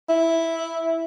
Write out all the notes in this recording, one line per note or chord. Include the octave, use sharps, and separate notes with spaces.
E4